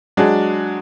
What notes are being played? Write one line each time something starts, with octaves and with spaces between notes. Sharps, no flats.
F#3 G#3 D4 F#4